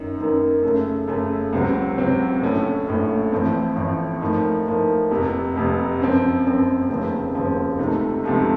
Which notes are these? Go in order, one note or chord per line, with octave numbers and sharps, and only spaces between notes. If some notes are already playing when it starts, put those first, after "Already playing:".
Already playing: F#2 D#3 A#3 D#4
F#2 D#3 A#3 D#4
F#2 C#3 A3
F#2 C#3 A3
C#2 C3 F#3 C4
C#2 C3 F#3 C4
A#1 A2 A3 C#4
A#1 A2 A3 C#4
A1 A2 F3 C4
A1 A2 F3 C4
A2 F3 A#3 D#4
A2 F3 A#3 D#4
F1 F2 C3
F1 F2 C3
F#2 F3 C4
F#2 F3 C4
F1 D#2 C#3 F3 C4
F1 D#2 C#3 F3 C4
C#2 C3 F3 A3 D#4
C#2 C3 F3 A3 D#4